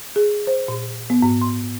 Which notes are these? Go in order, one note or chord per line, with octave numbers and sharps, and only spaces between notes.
G#4
C5
A#2
B3
G#2
C6